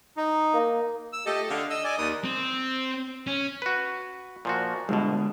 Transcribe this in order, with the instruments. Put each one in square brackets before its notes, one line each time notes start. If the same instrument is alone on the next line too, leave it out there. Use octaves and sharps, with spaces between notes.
[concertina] D#4
[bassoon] A#3
[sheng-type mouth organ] E6
[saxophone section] A3 F4 A4 [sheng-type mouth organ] G4 D#5
[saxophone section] D3 [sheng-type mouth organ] F5
[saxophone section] D#5 [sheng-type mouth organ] E6
[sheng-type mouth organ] D5 G#5
[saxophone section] D#2 [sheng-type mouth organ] D#6
[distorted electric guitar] C4
C#4
[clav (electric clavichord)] F#4 B4
A#2 F3 F#4
[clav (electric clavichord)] G1 B2 [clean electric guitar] D3 G#3